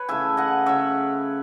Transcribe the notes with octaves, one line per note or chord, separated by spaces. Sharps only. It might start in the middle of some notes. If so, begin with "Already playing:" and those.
Already playing: B4 C#5
C#3 E3 A3 E5 G#5
D#5 F#5
C#3 F#3 C#4 C#5 E5